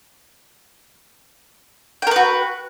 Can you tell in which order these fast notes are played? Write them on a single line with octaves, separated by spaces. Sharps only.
G5 A#4 B4 F#4